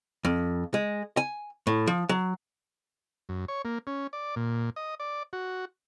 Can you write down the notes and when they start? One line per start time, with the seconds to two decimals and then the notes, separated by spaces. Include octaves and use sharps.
0.25 F2
0.74 G#3
1.17 G#5
1.67 A2
1.87 F3
2.09 F#3
3.29 F#2
3.48 C#5
3.65 A#3
3.87 C#4
4.13 D5
4.36 A#2
4.76 D#5
5.00 D5
5.33 F#4